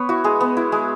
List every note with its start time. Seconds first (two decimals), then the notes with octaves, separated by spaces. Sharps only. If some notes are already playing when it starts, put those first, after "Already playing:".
Already playing: B3 B4 C#5
0.09 E4 F#4
0.24 G#3 G#4
0.41 B3
0.57 E4
0.72 G#3